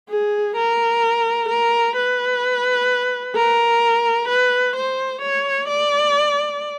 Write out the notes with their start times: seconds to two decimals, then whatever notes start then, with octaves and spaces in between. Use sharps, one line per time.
0.09 G#4
0.56 A#4
1.48 A#4
1.96 B4
3.35 A#4
4.28 B4
4.76 C5
5.22 C#5
5.68 D5